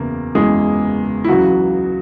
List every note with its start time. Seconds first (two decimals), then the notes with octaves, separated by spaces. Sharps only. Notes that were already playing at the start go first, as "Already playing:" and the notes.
Already playing: F#1 E2 C#3 A#3
0.35 F#1 E2 C#3 E3 G#3 G#4
1.24 E4
1.28 C#2 C#3 E3 F#3 F#4